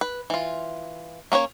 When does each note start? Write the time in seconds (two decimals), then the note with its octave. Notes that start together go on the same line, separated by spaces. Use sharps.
0.01 B4
0.30 E3 F4
1.32 A#3 C#4 D4 C#5